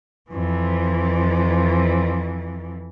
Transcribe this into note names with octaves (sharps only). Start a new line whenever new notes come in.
F2 E3